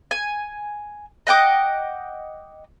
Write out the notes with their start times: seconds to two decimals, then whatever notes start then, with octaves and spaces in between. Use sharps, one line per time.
0.11 G#5
1.27 D#5 F#5 G5 D6